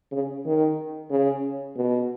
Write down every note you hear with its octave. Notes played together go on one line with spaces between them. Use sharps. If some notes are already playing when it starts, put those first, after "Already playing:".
C#3
D#3
C#3
B2